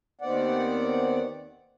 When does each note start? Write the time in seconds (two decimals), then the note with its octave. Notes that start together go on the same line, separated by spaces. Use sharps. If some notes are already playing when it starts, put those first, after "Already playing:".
0.21 D#2 D#3 B3 C4 D5 F#5